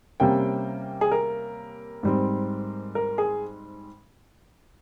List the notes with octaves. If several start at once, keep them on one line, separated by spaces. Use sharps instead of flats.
C3 G3 A#3 C#4 G5
G#4
A#4
G#2 G3 C4
A#4
G#4